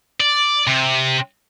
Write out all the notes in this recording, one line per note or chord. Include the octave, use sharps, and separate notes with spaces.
D5
C3